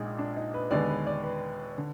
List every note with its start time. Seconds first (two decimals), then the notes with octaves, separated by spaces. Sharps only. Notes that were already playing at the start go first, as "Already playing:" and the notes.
Already playing: A#1 A#2 G#3 D#4 G#4
0.18 D4
0.36 D#4
0.54 B4
0.71 D#2 D3 G#3 B3 D5
0.89 B4
1.07 D5
1.23 B4
1.78 D3